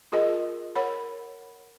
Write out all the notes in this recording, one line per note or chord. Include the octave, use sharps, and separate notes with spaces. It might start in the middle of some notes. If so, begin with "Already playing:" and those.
F4 G#4 A#4 D#5
A#4 C#5 F#5 B5